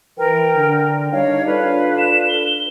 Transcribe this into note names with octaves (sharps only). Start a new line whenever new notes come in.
E3 A#4 B4 G5
D3
G3 D4 D#4 C#5 F5
D4 F4 A4 B4
E7
G7